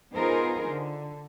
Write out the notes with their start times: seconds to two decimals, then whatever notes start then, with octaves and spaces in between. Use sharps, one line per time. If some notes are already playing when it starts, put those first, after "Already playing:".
0.14 B3 D#4 F4 G#4 A#4 C5
0.69 D3